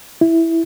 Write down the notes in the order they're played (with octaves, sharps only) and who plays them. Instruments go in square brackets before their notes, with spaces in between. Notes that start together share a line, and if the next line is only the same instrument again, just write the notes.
[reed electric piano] E4